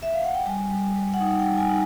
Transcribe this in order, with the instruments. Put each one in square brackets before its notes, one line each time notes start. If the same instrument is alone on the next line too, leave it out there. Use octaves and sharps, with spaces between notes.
[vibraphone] E5
F5
F#5
G5
G3 G#5
G3
G3
F#5
D#4 G5
G5
G3
G#5
D#4